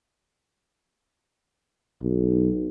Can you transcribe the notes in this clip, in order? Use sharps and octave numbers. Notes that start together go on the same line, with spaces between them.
B1